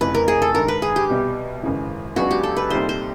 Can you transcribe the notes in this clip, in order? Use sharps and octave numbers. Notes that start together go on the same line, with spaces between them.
F1 F2 C#3 E3 B4
A#4
G#4
A4
G2 D#3 G#3 A#4
B4
G#4
G4
C2 B2 G3
G#1 F#2 C#3 E3
C#2 C#3 F#3 B3 D4 F#4
G4
A4
B4
C2 A#2 G3 C4 D#4 C5
C5